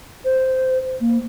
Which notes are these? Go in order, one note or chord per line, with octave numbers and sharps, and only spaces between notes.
C5
A#3